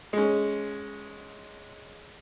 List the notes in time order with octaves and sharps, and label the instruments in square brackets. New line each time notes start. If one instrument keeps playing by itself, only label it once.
[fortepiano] G#3 C#4